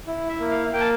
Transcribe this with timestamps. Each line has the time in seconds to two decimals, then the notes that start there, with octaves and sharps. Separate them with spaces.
0.07 E4
0.29 E5
0.40 A#3
0.51 F5
0.73 A#3 G5
0.81 A5